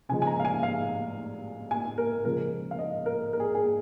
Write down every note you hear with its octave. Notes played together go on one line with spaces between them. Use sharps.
C#3 F3 G#3 G#5
G#5
A#5
F5
G#5
F5
G#5
A#4
C#3 F3 G#3 A#4
F5
D#5
A#4
A#4
G#4
G#4